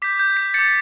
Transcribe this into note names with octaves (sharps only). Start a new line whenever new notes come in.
D6 G6 B6
G6
B6
D6 G6 A6 C#7